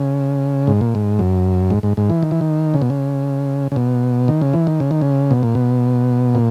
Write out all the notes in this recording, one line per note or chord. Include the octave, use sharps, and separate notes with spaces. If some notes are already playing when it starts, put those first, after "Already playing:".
Already playing: C#3
G#2
A#2
G#2
F#2
G#2
G#2
G#2
E3
D#3
E3
D#3
C#3
B2
C#3
C#3
B2
D#3
C#3
E3
D#3
C#3
D#3
C#3
B2
A#2
B2
A#2